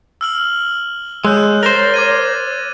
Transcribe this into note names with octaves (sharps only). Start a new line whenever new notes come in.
E6 F6 F#7
G#3 C#5 E6 F#6 G6
A#4 C5 A6
D6 G#6 D#7